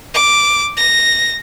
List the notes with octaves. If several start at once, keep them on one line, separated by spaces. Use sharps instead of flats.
D6
A#6